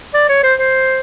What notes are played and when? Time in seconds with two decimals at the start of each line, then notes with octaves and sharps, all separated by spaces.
0.14 D5
0.29 C#5
0.43 C5
0.58 C5